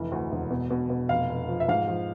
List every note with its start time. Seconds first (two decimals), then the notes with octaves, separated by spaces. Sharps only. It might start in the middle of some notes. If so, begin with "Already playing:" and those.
Already playing: F1 E3
0.12 D2
0.32 E1
0.51 B2
0.71 B2
0.90 B2
1.09 F1 F5
1.29 F1
1.49 F3
1.60 E5
1.68 G#2 F5
1.88 F3